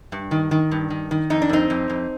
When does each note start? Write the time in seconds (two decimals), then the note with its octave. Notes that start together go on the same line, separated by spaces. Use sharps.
0.12 G2
0.31 D#3
0.51 D#3
0.71 G2
0.90 D#3
1.11 D#3
1.30 F2 D#4
1.42 D4
1.49 F2 C4 D#4
1.70 F2
1.90 F2